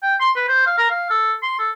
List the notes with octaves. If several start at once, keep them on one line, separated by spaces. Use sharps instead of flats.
G5
C6
B4
C5
F5
A#4
F5
A4
C6
A4